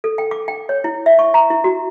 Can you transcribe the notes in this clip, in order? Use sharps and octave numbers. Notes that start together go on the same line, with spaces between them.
A4
G5
D6
G5
C#5
E4
E5
C#6
A#5
E4
F#4